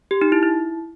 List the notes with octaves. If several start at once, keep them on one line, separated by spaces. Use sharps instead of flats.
G4
D#4
E4
E4